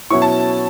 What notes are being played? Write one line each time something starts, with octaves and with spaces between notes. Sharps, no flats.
B2 F#3 C#4 E4 C#6
A5